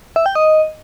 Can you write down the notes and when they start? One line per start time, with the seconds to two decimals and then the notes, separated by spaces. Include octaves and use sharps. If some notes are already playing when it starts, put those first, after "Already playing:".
0.16 E5
0.26 G5
0.35 D#5